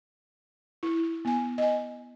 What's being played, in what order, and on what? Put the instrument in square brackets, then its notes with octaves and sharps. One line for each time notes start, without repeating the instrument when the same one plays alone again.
[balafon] E4
B3 G#5
D#5 G#5